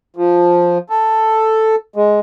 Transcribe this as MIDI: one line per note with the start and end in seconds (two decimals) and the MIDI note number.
0.16 0.78 53
0.90 1.75 69
1.96 2.20 56